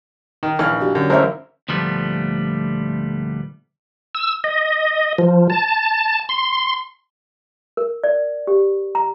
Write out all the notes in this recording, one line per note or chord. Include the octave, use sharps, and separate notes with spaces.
D#3 D#4
A#1 E3 D#4 F6
D4 F#4 G4
F#2 D3 A#4
A1 F#2 A#4 C5 C#5 E5
D2 A#2 F3 G3 A3 B3
E6
D#5
F3
A5
C6
A#4
D5
G4
A#5